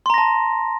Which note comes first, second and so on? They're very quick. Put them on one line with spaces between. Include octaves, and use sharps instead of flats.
C6 A#5 A#6 A5